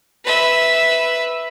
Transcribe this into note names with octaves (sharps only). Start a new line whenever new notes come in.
B4 E5